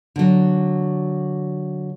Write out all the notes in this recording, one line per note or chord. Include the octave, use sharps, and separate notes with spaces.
D3 F#3